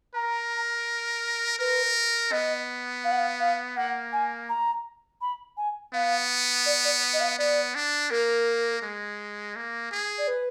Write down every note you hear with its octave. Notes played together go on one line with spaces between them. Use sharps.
A#4 A#5
A#4 B4
B3 D#5
F5
F#5
F5
F5
A#3 F#5
G#5
A#5
B5
G#5
B3 F5
D5
D5
D#5
F5
B3 D5
D4
A#3 A#4
G#3
A#3
G#4
D5
B4